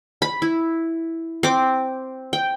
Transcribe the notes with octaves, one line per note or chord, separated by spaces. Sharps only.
B5
E4
C4 D6
G5